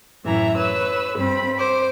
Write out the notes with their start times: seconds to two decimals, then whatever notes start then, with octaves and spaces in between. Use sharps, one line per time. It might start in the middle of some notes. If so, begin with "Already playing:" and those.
0.24 F#2 A2 E3 E5 A#5
0.57 B4 C#5 E6
1.16 G2 C4 B5
1.58 C5 D6